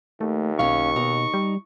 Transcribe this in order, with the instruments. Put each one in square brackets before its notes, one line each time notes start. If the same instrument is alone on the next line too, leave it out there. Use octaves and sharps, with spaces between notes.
[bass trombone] D#2 [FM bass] A3
[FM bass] B1 [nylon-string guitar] C#4 F5 [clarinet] C#6
[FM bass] B2 [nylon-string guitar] D#4
[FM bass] G3